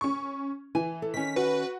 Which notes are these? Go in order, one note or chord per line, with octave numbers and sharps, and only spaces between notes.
C#4 C#6
E3 G#5
A4
D#3 C#4 B6
F#4 B4